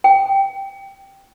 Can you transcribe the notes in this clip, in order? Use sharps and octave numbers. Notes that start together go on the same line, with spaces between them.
G5